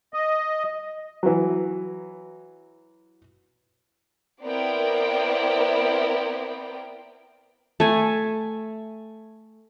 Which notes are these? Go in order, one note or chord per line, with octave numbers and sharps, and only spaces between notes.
D#5
E3 F#3
B3 C4 E4 A#4 D5 G5
A3 G#5